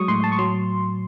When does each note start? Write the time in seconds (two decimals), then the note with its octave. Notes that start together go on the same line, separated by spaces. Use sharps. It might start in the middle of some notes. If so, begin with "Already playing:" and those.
Already playing: F#3 G#3 C#6 D#6
0.08 A2 C6
0.24 A5
0.32 C#6
0.39 F#3 C6